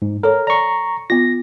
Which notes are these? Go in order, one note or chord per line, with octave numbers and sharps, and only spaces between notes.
G#2
A4 A#4 C#5
D5 A#5 C#6
B3 F4 A#6